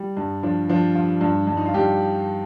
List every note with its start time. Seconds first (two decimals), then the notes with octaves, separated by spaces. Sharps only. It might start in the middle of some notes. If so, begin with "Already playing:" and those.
Already playing: G3
0.17 G2
0.43 F3 D4
0.69 F3 D4
0.95 F3
1.21 G2
1.47 G2
1.57 D#4
1.66 F4
1.74 G2 G4